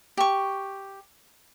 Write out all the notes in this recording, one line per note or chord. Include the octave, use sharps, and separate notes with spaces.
G4 C#6